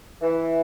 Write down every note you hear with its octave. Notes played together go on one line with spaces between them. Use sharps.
E3